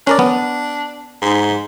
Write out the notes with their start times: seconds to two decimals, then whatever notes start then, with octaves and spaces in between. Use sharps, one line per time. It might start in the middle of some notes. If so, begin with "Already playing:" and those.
0.07 C#4 D4 A#4 D5
0.19 B3
1.22 G#2